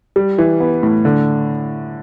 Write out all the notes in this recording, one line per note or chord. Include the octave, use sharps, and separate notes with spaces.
G3
E3
B3
A2
D3